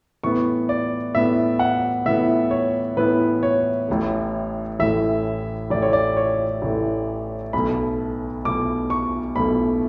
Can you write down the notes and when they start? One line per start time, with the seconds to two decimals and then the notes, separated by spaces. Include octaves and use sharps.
0.23 A2 E3 B3 E4 C#6
0.69 D5
1.15 A2 E3 B3 E4 E5
1.59 F#5
2.05 A2 E3 B3 E4 E5
2.51 C#5
2.97 A2 E3 B3 E4 B4
3.43 C#5
3.88 A1 A2 E3 A3
4.80 A1 A2 E3 A3 E5
5.70 A1 A2 E3 A3 D5
5.82 C#5
5.93 D5
6.17 C#5
6.62 A1 A2 E3 A3
7.53 B1 B2 A3 B5
8.44 B1 B2 A3 D6
8.90 C#6
9.36 B1 B2 A3 B5